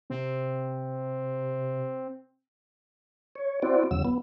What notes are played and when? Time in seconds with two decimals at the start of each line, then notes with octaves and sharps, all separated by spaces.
0.10 C3 C4
3.35 C#5
3.62 C4 E4 F#4 C5 D5
3.91 E2 C#3 F#3 E6
4.05 B3